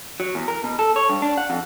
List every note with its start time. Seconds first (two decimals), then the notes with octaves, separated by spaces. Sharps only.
0.20 F#3
0.35 E2
0.48 A#4
0.64 B2
0.79 A4
0.96 C#5
1.09 G2
1.22 D4
1.38 F#5
1.50 F2